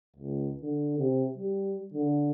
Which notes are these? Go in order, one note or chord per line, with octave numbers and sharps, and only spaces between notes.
C#2
D3
C3
G3
D3